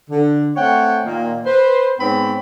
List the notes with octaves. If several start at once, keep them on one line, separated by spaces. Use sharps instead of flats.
D3
A3 C4 C#5 F#5 G5
A#2 D#3 A#3
B4 C5
G#2 B3 C4 C#5 G5 B5